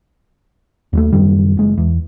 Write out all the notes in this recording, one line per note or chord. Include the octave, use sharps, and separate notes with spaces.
D#2 G3 A3
F#1 F#2 D#3 G3
F#1 G#3
E2